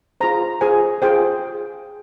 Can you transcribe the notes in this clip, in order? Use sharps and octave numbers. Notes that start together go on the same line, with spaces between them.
F4 G#4 C5 A#5
F4 G#4 C5 G#5
F4 G#4 C5 G5